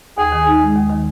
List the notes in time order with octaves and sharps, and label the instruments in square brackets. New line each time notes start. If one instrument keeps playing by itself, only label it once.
[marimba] D#2 [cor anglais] G#4
[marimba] D#3
D#4
G#3
D#2
D#3